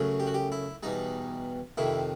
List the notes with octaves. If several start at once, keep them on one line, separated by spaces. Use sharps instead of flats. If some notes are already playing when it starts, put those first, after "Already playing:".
Already playing: F#2 C#3 F#3 A3
G4
F#4
G4
E4
E2 B2 G3 D#4
F2 C3 D#3 E4